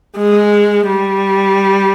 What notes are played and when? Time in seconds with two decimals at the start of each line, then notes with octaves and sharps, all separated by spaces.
0.16 G#3
0.87 G3